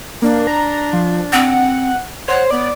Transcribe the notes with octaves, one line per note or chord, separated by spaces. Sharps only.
A#3 D4
A#5
F3
C4 F#5
C5 C#5 F#5
B3 D5